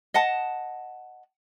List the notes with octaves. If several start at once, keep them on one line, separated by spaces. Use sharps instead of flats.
D#5 F#5 A5